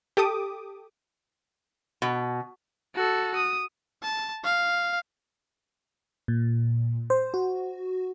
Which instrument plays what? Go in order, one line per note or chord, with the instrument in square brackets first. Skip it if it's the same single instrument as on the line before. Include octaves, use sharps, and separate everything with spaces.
[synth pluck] G4 A4 D6 D#6
[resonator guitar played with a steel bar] B2
[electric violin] F#4 A4
D#6
A5
F5
[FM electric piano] A#2
C5
F#4